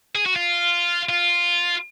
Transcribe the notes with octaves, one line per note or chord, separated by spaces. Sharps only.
G#4
F#4
F4
F4